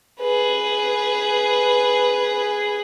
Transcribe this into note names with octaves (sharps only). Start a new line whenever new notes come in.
G#4 B4